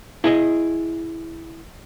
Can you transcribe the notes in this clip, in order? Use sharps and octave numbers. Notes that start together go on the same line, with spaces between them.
E4 G#4 D#5